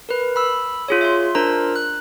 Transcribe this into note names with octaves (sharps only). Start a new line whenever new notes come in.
A#4 B4
B5 E6
F4 G#4 C#5
E5 C6
D4 F4 A#4 C5 A#5
F#6